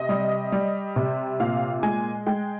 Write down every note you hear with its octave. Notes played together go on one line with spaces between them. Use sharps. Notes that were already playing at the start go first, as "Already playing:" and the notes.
Already playing: C3 D#5
G3
G3
C3
A#2 F5
G#3 G#5
G#3 G5